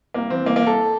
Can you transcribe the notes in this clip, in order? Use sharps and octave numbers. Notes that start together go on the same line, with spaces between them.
C2 A#3
E3 C4
C2 A#3
A#3
C2
A4